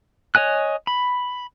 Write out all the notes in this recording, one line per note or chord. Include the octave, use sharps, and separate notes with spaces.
C#5 D#5 G#5 F#6
B5